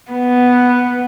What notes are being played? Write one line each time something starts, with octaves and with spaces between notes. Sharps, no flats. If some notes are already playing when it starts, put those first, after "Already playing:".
B3